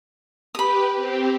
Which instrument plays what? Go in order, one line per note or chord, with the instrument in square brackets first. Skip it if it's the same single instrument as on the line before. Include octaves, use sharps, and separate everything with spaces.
[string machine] G4 B4 [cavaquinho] B5 D#6
[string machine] C4 G4